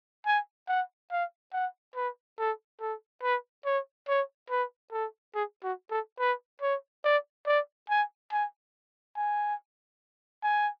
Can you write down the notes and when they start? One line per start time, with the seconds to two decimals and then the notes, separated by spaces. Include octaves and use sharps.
0.26 G#5
0.68 F#5
1.11 F5
1.53 F#5
1.96 B4
2.38 A4
2.80 A4
3.23 B4
3.65 C#5
4.08 C#5
4.50 B4
4.92 A4
5.35 G#4
5.64 F#4
5.91 A4
6.19 B4
6.62 C#5
7.04 D5
7.47 D5
7.90 G#5
8.32 G#5
9.16 G#5
10.43 G#5